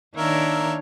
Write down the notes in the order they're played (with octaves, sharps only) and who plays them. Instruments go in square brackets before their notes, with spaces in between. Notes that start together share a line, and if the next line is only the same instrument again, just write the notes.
[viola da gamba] D#3 D4 C#5 [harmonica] A#3 A#4 E5